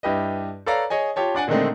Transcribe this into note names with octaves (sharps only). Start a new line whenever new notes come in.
G2 E4 G4 B4 D#5
A4 B4 C#5 D5 F5 A#5
G#4 C#5 D#5 G#5
F4 G4 C#5 A5
D4 D5 F#5 G#5
A#2 D3 D#3 G#3 A3 C4